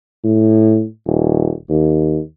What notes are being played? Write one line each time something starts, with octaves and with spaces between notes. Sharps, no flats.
A2
D#1
D#2